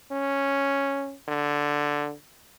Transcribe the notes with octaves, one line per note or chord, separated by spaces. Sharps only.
C#4
D3